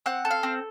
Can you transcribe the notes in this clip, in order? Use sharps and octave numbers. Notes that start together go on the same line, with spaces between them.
C4 F#5
A4
F5
C4